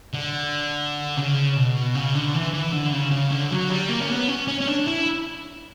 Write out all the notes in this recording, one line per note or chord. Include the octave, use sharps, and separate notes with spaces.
D3
C#3
B2
C#3
D3
E3
E3
D3
C#3
C#3
D3
F#3
G3
A#3
C#4
B3
C#4
C#4
C#4
D4
E4